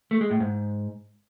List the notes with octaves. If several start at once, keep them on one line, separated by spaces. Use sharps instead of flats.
A3
G#3
A2
G#2